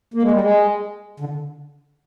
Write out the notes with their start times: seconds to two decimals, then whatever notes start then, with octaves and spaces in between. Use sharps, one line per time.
0.14 A#3
0.22 G#3
0.31 G3
0.41 G#3
1.20 D3